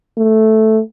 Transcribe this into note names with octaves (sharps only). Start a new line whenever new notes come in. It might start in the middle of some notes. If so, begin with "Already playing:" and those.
A3